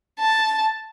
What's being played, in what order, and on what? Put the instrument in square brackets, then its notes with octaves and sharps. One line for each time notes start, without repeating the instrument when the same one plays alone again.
[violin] A5